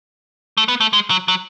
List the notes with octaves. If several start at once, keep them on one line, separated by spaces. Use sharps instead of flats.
A3
B3
A3
G#3
F#3
F#3